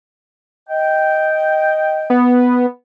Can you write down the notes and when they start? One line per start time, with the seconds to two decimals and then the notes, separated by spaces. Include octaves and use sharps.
0.69 D#5 G5
2.10 B3